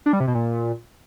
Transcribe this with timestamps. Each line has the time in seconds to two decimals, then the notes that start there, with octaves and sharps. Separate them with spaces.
0.06 D4
0.13 G3
0.20 C3
0.27 B2
0.35 A#2